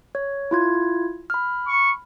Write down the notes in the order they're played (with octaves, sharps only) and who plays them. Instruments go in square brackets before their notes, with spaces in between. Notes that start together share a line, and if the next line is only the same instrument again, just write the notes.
[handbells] C#5
E4 F4 G#6
B5 F6
[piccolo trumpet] C#6